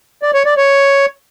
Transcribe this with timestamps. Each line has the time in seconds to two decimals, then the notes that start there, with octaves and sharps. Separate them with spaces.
0.23 D5
0.34 C#5
0.46 D5
0.57 C#5